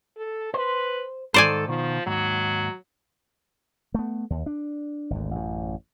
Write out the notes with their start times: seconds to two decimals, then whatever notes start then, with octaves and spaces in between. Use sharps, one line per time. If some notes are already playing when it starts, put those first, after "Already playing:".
0.17 A4
0.54 B4 C5
1.34 G#2 D#3 A4 C5 D5 G#5
1.68 B2 D#3 F3
2.07 D#2 G#2 F#3
3.94 A3 B3
4.30 D#2
4.46 D4
5.10 G#1 D2
5.31 A1 F#2